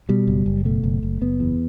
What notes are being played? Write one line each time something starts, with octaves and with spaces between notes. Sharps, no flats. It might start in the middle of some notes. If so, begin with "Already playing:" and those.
B2 G3
F#1
F#1
B2 A3
F#1
F#1
F#1 B3
E2